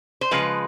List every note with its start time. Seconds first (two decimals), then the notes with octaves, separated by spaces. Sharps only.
0.21 C5
0.31 C#3 F3 G#3 B4